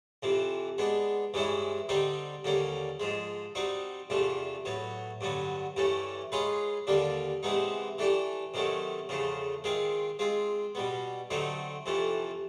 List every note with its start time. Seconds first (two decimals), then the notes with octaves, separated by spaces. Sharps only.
0.23 F2 C3 E3
0.78 G#3 B3 D4
1.34 G2 E3 G#3 C#4 E4
1.89 D3 G3 C4 D#4 G4
2.44 D#2 D3 G3 A#3 C#4
3.00 G#2 F3 G#3
3.55 G3 C4 D#4 F#4
4.10 E2 C3 F3 A3 D4
4.65 A2 F#3 B3
5.21 G2 D3 F#3 B3
5.76 G2 E3 A3 C#4
6.32 G#3 C#4 F4 G#4 B4
6.87 D#2 D3 G3 A#3 D4
7.43 C3 E3 G#3 B3 D#4
7.98 E3 A3 D4 G4
8.54 C3 D#3 F#3 A3 C#4
9.09 E2 C#3 F3 A3
9.64 D#3 G#3 C4 F4
10.19 G#3 C4 F4
10.75 B2 G3 B3
11.30 D3 F#3 A3 C4 D#4
11.86 F2 C3 E3 A3